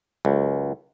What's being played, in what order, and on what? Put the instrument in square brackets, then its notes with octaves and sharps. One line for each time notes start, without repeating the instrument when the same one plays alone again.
[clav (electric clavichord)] C#2 F#2